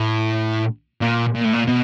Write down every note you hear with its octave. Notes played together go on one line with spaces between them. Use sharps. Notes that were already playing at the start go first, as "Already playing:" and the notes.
Already playing: A2
A#2
A#2
A2
A#2
B2